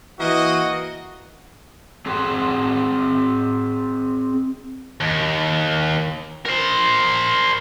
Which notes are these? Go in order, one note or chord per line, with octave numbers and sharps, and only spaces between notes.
E3 A#3 F#4 D#5
C4 G#4 C5 F#5
D#2
A#4 C5